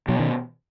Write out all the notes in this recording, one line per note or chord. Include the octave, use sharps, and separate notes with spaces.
B2 F#3
D#3